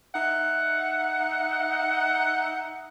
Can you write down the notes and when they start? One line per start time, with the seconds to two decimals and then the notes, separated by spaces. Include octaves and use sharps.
0.14 D#4 E5 F#5